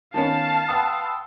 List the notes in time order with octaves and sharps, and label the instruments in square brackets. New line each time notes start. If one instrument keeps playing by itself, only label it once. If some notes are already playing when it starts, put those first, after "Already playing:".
[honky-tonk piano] D#3 B3 C#4 [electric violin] F5 [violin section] A5
[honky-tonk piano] B4 F#5 D#6 [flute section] G5 C6 E6